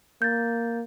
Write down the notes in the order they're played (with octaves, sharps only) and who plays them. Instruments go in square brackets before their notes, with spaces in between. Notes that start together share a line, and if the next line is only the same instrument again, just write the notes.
[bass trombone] A#3 [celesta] G6 A6